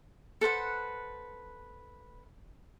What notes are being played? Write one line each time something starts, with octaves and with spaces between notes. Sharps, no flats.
A4 B4 C5 F#5